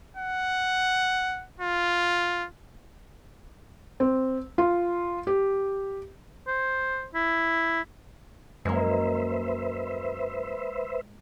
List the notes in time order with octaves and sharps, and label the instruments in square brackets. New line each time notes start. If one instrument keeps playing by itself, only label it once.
[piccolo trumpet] F#5
F4
[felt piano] C4
F4
G4
[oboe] C5
E4
[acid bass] F#2 [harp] G#3 A#3 [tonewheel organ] B4 C5 E5